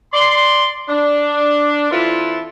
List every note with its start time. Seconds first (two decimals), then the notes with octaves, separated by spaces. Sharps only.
0.13 D5 C6
0.89 D4
1.91 E3 C4 E4 F4 A4 B4